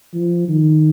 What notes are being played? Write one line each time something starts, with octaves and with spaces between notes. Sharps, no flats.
F3
D#3